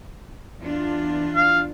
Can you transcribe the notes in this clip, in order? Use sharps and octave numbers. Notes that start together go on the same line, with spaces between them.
E2 D4 F4
F5